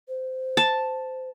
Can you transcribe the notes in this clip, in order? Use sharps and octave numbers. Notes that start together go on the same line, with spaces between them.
C5
A5